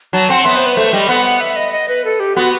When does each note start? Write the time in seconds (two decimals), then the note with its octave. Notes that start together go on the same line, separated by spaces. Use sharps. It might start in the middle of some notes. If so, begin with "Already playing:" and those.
0.13 F#3 A5
0.29 C4 F#5
0.45 B3 E5
0.56 C5
0.66 B4
0.77 A3 C5
0.93 G3 D#5
1.09 B3 F#5
1.25 F#5
1.40 E5
1.56 D#5
1.72 D#5
1.88 B4
2.05 A4
2.20 G4
2.36 B3 F#4